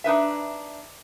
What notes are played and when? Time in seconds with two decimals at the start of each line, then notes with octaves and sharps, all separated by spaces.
0.04 D4 D#4 B4 E5